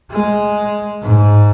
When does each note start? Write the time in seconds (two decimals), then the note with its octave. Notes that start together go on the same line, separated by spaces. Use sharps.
0.11 G#3
1.02 G#2